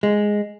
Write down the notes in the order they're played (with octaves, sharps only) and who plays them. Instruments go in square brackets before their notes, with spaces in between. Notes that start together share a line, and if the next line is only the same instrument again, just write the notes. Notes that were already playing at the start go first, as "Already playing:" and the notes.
[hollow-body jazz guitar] G#3